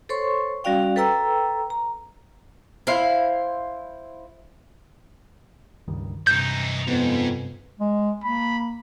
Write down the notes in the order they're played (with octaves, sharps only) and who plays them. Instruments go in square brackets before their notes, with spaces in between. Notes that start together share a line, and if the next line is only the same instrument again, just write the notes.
[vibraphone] A4 C5 C#5 C6 C#6
G3 C#4 F#4 D5 F5 G5
A4 B4 G5 A#5 E6
A#5
[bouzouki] E4 C5 F5
[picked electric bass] C#2 G2 D#3
[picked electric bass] G2 C3 [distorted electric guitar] E3 D#4 [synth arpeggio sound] G6
[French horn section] F2 B3 [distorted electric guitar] G#2
[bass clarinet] G#3
[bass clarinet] A#3 [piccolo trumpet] B5